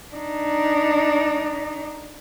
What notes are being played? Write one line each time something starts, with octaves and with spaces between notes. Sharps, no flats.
D4 D#4